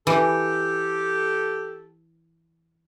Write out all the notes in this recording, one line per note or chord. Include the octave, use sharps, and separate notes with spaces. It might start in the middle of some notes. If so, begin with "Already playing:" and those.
E3 G4 A4